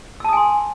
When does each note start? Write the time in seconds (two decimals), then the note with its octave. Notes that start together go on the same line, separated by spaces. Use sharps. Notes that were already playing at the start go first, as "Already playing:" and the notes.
0.20 E6
0.24 A5
0.29 D#6
0.33 G#5
0.37 C6